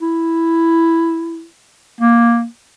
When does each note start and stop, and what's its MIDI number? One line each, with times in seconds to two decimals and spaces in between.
0.01 1.45 64
2.00 2.45 58